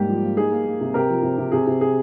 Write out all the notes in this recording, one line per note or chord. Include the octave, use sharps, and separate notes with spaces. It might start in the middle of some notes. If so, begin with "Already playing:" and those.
Already playing: G#2 G3 A#3 G4
F3
A#3
D#4 G#4
A#3
A#3
C3
C3 G4 A#4
F3
C3
C3
C3 G#4
C3
G#4